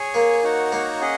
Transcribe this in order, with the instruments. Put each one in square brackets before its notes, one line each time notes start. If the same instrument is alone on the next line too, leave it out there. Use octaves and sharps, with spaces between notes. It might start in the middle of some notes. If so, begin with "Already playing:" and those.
Already playing: [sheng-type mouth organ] G#4 C#5 G#5
[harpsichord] A#3
[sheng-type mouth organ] D#4 F#4 C#5 F#5
[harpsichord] A#3
[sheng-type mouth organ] C#4 G#4 D#5 F#5